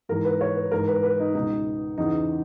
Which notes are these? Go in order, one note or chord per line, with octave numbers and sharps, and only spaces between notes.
G#2 E3 A#4
B4
C#5
B4
G#2 E3 A#4
B4
B4
D#4
C#2 B2 D#4
E2 C#3 E3 D#4